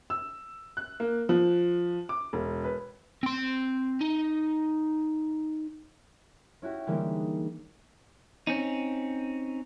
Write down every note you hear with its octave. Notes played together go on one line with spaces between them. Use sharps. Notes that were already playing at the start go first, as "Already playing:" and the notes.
E6
F#6
A#3
F3
D6
E1
B4
C4 C6
D#4
C#4 E4 F#4 G4
D3 E3 G3 G#3 A#3 D#4
C4 C#4 D#4